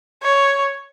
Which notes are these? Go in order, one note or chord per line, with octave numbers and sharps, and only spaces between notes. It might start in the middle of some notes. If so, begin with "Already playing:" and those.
C#5